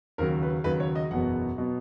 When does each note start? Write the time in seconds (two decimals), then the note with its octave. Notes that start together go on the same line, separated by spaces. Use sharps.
0.18 D#2 C#3 F#3 A#4
0.42 B4
0.64 D#2 C#3 F#3 B4
0.80 C#5
0.95 D#5
1.11 F#1 E2 B2 F#3 B3 F#5
1.58 B2 F#3 B3